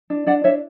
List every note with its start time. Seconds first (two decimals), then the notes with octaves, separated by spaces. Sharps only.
0.10 D4
0.26 D4 D5 F#5
0.44 D4 C#5 E5